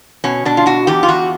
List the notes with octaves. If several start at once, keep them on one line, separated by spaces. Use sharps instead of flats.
B2 C#4
B2 D4
F4
B2 F#4
E2 G4
F4
E2 F#4